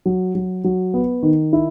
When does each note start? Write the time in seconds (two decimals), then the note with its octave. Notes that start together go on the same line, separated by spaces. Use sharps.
0.06 F#3
0.35 F#3
0.64 F#3
0.94 B3
1.23 D#3
1.53 E4